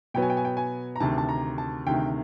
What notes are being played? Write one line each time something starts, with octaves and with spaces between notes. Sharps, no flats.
B2 F#3 B3 G5
G#5
G5
G#5
G5
G#5
A#5
D2 C3 D#3 A5
A5
A#5
A5
D2 C3 D#3 G5